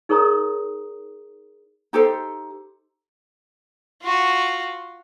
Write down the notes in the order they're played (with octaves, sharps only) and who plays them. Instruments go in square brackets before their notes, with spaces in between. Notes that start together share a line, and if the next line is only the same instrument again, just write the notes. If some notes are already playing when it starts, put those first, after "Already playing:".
[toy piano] D#4 G#4 A#4 C#5 A#5 D#6
[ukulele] D#4 G4 A4 C5
[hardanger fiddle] F4 F#4